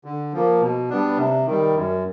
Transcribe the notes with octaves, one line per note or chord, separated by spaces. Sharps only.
D3
F3 A#3
B2
G3 B3 D4
C3
D#3 G3
F#2